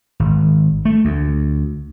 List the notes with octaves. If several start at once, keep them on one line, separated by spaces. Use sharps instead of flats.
G#1
A3
D2